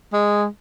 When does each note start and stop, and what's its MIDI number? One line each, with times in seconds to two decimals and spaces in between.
0.13 0.46 56